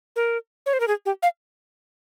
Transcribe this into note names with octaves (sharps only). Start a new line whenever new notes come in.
A#4
C#5
C5
A#4
G#4
G4
F5